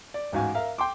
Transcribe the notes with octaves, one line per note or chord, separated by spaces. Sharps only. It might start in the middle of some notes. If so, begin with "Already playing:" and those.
D5
A1 G#2 F#4 F5 G#5
A#4 E5 F5
G5 C6 D6